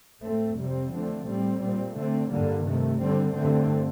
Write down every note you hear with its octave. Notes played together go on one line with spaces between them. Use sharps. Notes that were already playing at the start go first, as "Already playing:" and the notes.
A2 A3 C4
F2 C3 G3 C4
D3 F3 A3 C4
A2 G3 C4
A#2 G3 C4
D3 A3 C4
G2 D3 G3 A#3
C3 D#3 A3
D3 G3 C4
G2 D3 A3 C4